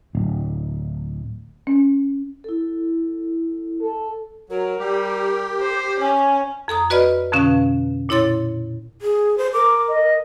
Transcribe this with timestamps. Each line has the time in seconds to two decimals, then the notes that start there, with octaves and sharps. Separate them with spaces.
0.15 D1
1.67 C#4
2.44 E4 A4
3.81 A4
4.50 F#3 A#4
4.79 G3 G4
5.61 C5
6.00 C#4 G#5
6.68 F2 A4 A#5 D#6
6.90 F#4 B4 D5 D#5 B5 F6
7.32 F2 B2 D3 C#4 F5
8.09 A#2 E4 C#5 C6 A6
9.02 G#4
9.38 C5
9.53 A#4 D6
9.88 D#5